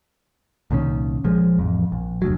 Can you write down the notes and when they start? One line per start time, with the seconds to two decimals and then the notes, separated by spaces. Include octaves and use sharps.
0.71 C2 A#2 D#3 C#4
1.24 A#1 F3 G#3
1.59 A1 F2
1.92 A#1
2.22 F1 D2 F#3